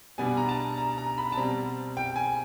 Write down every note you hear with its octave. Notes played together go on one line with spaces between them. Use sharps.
B2 G3 B3 D4 G#5
A#5
A5
A#5
A#5
B5
A5
B2 G3 C4 A#5
G5
G#5